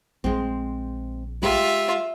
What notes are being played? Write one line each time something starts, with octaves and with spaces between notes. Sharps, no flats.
A#1 G#3 C4
G#3 F4 G4 E5